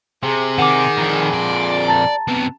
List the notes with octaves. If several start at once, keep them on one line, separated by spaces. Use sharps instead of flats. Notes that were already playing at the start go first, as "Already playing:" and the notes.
C3 G#4
D#3 F#5 G#5 D6
F2 A#2
D5
A5 A#5 A6
C3 B3